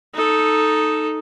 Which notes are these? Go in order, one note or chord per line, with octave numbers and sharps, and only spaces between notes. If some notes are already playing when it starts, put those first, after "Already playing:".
D#4 A4